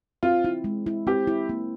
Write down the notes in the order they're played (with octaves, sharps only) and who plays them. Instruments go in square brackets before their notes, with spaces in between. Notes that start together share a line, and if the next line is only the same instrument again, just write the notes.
[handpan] C4 [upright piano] F4
[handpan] E4
G#3
E4
[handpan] C4 [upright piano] G4
[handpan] E4
A#3